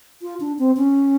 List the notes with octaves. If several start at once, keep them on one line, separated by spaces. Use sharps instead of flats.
F4
D4
C4
C#4